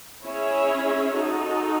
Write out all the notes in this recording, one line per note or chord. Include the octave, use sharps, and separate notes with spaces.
C#4 E4 G#4 C#5 E5
D#4 F#4 A4